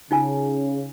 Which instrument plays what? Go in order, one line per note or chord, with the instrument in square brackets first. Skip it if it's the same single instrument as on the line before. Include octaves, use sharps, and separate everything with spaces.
[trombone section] C#3 [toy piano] D#4 F4 G#5